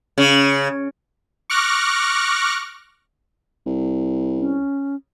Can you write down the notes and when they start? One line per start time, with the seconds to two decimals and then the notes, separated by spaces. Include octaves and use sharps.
0.18 C#3
1.50 C#6 D6 F6 F#6 A#6
3.66 C2
4.38 C#4